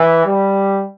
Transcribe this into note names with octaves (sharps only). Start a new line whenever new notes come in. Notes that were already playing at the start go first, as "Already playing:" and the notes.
Already playing: E3
G3